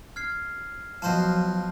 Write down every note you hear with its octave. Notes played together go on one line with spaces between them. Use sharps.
F6 G#6 C7
B2 F3 F#3 C5 F5 A5 C6 G6